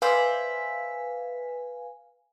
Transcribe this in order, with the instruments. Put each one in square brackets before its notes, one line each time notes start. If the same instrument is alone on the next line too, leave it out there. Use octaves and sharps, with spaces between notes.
[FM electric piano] B4 F5 G#5 [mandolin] C5 D5 E5